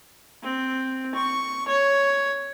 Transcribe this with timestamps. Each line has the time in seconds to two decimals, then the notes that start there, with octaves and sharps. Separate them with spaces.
0.43 C4
1.15 C#6
1.67 C#5